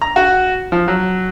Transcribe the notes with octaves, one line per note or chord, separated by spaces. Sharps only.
A#5
F#4
F3
F#3